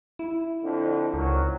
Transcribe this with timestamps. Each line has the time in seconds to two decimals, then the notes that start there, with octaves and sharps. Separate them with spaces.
0.19 E4
0.62 F2 D3
1.14 G#1 C#2 F#3 A#4